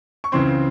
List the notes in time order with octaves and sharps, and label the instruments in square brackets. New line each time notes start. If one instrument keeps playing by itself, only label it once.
[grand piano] C#6
C#2 C#3 E3 C4 C6